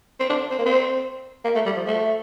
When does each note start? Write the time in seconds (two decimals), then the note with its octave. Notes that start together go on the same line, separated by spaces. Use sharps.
0.20 C4
0.30 D4
0.51 C4
0.59 A#3
0.66 C4
1.45 A#3
1.56 A3
1.66 G3
1.76 F3
1.87 A3